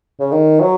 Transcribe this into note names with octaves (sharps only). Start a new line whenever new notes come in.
C#3
D#3
F#3